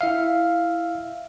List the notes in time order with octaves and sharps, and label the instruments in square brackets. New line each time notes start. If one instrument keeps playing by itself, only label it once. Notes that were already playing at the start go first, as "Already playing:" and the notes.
[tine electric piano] E4 E5 F5